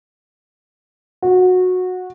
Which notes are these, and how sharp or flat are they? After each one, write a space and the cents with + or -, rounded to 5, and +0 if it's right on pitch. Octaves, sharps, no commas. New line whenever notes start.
F#4 -15